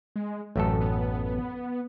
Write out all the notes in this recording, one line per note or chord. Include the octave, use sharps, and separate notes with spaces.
G#3
A1 F#2 A3 A4
B3